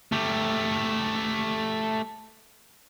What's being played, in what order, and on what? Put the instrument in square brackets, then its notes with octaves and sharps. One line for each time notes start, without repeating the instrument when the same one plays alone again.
[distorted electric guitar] A3 G4